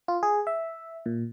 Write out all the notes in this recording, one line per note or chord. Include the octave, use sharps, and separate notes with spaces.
F4
G#4
E5
A#2